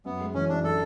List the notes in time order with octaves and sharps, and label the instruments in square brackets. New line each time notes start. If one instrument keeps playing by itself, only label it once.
[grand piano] F#2 [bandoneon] B3
[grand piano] G#3
[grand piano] E3 [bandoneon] C#4
[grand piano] F#2 [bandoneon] D4
[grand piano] D4 [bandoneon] A4